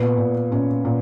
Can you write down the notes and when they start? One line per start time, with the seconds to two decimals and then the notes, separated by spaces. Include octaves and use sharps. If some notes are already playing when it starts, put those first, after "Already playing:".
Already playing: A#2 B3
0.18 A#2
0.52 A#2 C#4
0.85 A#2